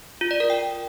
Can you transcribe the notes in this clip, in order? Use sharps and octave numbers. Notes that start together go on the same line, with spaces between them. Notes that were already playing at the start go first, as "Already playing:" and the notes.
F4
D5
A#4
G5